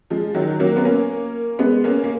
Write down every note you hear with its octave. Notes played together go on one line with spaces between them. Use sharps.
F3 G#3
D#3 F#3
F#3 A#3
B3
A#3 C#4
G#3 B3
A#3 C#4
A#3